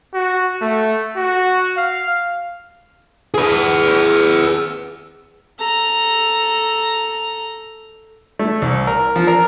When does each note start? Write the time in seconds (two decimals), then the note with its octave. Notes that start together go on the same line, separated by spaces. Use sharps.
0.14 F#4
0.62 A3
1.17 F#4
1.77 F5
3.34 G#4 B4
5.59 A4 A#5
8.39 A3
8.62 C2
8.87 A#4
9.16 F3
9.27 A#4